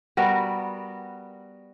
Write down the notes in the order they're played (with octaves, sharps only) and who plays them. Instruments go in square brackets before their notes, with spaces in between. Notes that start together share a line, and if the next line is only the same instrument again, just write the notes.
[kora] G3 B3 F#4 A#4